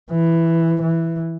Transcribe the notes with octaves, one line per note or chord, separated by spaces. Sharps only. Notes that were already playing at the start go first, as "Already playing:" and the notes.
E3
E3